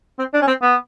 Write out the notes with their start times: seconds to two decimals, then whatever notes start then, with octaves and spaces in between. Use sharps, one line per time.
0.19 C4
0.33 D4
0.42 C#4
0.47 C4
0.62 B3